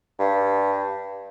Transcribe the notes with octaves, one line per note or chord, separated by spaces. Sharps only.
G2